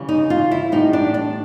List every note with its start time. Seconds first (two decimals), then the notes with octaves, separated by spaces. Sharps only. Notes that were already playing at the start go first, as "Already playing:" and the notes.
Already playing: C#3 E3 G3
0.09 D#4
0.30 F4
0.51 E4
0.72 A2 E3 G3 D#4
0.93 D4
1.14 D4